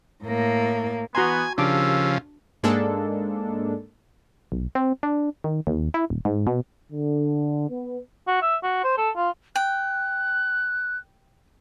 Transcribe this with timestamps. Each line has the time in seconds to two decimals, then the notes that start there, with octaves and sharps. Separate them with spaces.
0.24 A2 A#3
1.15 E3 B3 F#4 G#5 A#5 C6
1.58 D#2 C#3 F3 D4 G4 A5 D6 E6
2.63 G#2 G#3 A#3 D4 A4
4.52 B1
4.75 C4
5.03 D4
5.44 D#3
5.67 D#2
5.94 E4
6.10 D#1
6.25 G#2
6.47 B2
6.92 D3
7.70 B3
8.27 F#4
8.42 E5
8.63 F#4
8.84 C5
8.98 A4
9.16 F4
9.56 G5 F#6